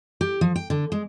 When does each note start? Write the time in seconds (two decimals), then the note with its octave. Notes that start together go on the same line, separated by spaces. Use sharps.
0.21 G4
0.41 F3
0.56 G5
0.70 D3
0.92 G#3